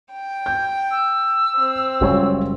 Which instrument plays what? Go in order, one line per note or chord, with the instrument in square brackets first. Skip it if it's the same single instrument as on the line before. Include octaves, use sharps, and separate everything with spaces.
[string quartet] G5
[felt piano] G6
[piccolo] E6
[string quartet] C4
[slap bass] F#1 G#3 C#4 [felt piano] G3 F4 C#5